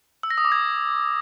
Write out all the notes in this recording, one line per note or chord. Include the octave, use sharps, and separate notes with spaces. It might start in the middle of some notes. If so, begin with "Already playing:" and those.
E6
A#6
D#6
D6
G#6